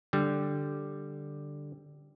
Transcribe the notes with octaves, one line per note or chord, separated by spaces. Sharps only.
D3 G3